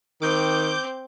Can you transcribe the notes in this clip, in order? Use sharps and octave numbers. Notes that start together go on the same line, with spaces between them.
D#3 C4 D6 G6